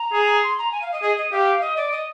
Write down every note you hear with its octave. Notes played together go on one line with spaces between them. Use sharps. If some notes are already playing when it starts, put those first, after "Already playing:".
Already playing: A#5
G#4
C6
A#5
G#5
F5
D#5
G#4 D#5
D#5
G4 F5
D#5
D5
D#5